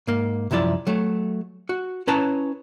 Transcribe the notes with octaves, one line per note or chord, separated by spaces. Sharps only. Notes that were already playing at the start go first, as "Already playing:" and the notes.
G#2 A#3
C2 F#2 F3 E4 D5
F#3 A3
F#4
C#4 E4 B4 C#5 A5 A#5